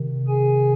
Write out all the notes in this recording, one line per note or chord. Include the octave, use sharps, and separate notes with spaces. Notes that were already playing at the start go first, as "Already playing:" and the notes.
Already playing: C3 D#3
G#4 G#5